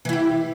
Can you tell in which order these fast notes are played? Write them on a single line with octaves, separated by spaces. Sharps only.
E3 E4 G4